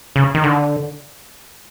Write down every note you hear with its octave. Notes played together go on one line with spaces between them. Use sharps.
C#3
D#3
D3